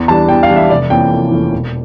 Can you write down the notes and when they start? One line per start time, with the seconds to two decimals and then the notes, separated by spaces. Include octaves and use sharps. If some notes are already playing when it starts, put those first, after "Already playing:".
Already playing: E2
0.08 E3 G3 D4 A5
0.29 E2 G5
0.43 F5
0.49 E3 G3 D4
0.56 E5
0.70 F1 D5
0.90 F2 E3 A#3 C#4 G5
1.11 F1
1.31 F2 E3 A#3 C#4
1.52 E1